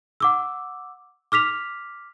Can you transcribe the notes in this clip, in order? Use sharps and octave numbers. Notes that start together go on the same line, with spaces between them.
F#5 D6 E6
D6 F6 B6 F7